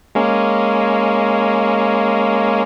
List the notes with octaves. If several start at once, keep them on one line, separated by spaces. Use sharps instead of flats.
G#3 A#3 C#4